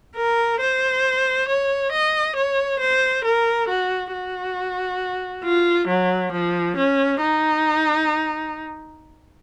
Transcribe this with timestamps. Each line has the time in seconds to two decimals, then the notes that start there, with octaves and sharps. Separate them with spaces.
0.16 A#4
0.60 C5
1.49 C#5
1.92 D#5
2.36 C#5
2.80 C5
3.25 A#4
3.68 F#4
4.12 F#4
5.44 F4
5.88 F#3
6.32 F3
6.77 C#4
7.21 D#4